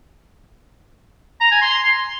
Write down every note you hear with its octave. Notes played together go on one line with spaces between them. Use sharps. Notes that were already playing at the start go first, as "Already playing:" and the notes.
A#5
G#5
C6